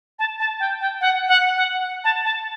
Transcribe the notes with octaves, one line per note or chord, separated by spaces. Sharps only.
A5
A5
G5
G5
F#5
F#5
F#5
A5
A5